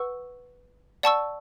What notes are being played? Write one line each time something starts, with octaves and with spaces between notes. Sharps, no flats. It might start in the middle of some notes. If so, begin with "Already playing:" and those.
Already playing: B4 F#5 C#6 E6
D5 F#5 A5 C#6 E6